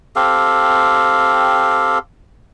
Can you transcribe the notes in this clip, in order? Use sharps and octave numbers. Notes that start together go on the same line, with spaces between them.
C4 G4 A4 F5